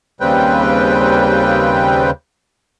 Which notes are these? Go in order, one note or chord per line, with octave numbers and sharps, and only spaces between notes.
D#2 C#3 G3 C4 B4 G5